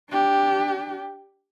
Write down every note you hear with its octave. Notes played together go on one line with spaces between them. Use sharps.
D4 G4